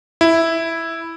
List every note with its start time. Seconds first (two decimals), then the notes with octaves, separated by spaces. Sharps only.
0.21 E4